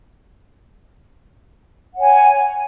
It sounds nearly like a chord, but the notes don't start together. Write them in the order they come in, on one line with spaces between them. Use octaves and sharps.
F#5 C#5 G#5